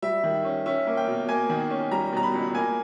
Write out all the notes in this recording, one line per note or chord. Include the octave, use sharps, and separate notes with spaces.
G3 E5
D#3
C#4
C#4 E5
A#3
G5
B2
A#3 G#5
D#3
C#4
G3 A#5
B2 A#5
B5
C#2
A#3 G#5